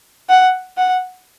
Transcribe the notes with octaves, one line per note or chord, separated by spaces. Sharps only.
F#5
F#5